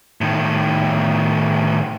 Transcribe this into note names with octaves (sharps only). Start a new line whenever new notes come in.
A2 D#3